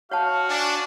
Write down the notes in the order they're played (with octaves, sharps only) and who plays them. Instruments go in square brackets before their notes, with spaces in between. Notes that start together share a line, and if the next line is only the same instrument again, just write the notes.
[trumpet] F#4 [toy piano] C#5 F#5 A5 [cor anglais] F5
[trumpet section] D4 [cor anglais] G#5